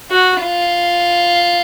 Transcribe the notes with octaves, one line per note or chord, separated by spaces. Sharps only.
F#4
F4